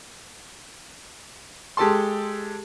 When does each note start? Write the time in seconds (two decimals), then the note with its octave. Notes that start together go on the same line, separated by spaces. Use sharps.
1.77 G#3 G4 A4 A5 C6